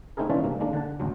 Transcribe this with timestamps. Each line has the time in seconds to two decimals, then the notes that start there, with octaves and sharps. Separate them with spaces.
0.17 A3 C4 D#4 E4 G#4 A#4
0.30 E3 G#3 C#4 D4 F4 D5
0.44 G2 C3 A#3
0.60 D#3 G#3 A#3 D4
0.73 D3 F#5 A5
1.00 A1 D2 F#3